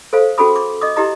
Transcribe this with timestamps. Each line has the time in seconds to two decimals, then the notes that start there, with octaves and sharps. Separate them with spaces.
0.13 A4 C5 F5
0.38 C#4 F#4 G#4 A4 B5 D#6
0.56 D6
0.81 D#5 D6 D#6
0.96 E4 G4 D#5 A#5 D#6